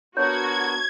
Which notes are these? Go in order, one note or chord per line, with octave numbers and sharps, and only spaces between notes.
B3 D4 F#4 A#4 C#5 G#6